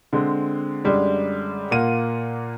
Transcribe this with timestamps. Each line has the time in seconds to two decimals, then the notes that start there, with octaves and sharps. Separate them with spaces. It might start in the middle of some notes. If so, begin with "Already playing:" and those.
0.13 D3 G#3 C4
0.85 F#2 D3 G3 G#3
1.71 A#2 A#3 F4 F#5 D#7